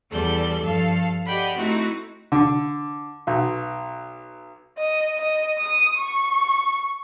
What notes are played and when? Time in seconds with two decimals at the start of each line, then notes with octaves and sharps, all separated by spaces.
0.11 E2 G3 A4 D5 G6
0.62 G2 F3 A4 F5
1.26 G4 D5 D#5 F#5 G5 B5
1.57 A3 C4 D#4 E4 F#4
2.32 D3
3.27 B1
4.78 D#5
5.18 D#5
5.59 D#6
5.98 C#6